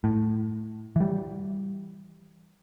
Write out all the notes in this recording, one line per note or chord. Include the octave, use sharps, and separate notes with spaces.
A2
E3 G3